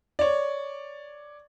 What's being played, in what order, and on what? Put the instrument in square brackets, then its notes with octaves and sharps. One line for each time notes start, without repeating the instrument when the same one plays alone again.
[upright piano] C#5 D5